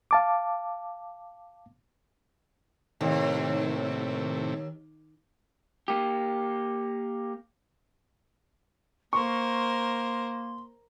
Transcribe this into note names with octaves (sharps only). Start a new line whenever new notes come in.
F5 A5 D6
D#2 A2 C3
A#3 G4
A#3 A#4 C5 C6 C#6